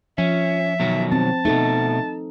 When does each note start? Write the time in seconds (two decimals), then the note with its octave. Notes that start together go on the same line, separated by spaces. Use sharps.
0.18 F3 C#4 E5
0.80 B2 D#3 F#3
1.12 C4 A5
1.45 B2 A3 D#4 A4